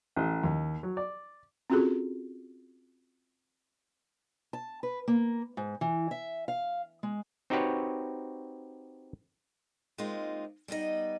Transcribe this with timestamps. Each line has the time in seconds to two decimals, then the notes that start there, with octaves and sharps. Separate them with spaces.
0.16 A1
0.44 D#2
0.83 F#3
0.97 D5
1.70 C4 C#4 F4 F#4 G#4 A4
4.53 A5
4.83 B4
5.08 A#3
5.57 G#2
5.81 E3
6.11 E5
6.48 F5
7.03 G#3
7.50 C4 D#4 F#4 G4 B4 C#5
9.98 G#3 A#3 C4 D#4 F4
10.68 G3 B3 D#4 D#5